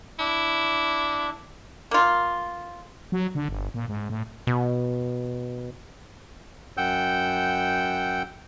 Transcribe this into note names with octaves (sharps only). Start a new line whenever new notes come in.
D4 E4
A#3 F4
F#3
D3
G1
A#2
G#2
A2
B2
F#2 F#5 G5 E6 G6